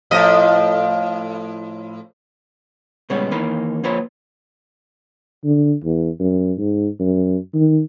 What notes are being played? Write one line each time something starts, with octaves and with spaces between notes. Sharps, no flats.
A2 F3 D#5
A#2 C#3 G3 G#3 B3 C#5
D#2 E3 A#3 D#4 B5
F3 A#3 F4 B4 C#5
D3
E2
F#2
G#2
F#2
D#3